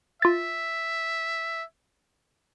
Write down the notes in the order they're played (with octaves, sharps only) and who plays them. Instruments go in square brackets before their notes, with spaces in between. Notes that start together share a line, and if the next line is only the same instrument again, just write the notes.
[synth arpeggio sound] F4 A6 [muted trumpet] E5